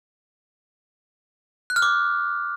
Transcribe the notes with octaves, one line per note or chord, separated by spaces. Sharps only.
F#6
F6
D6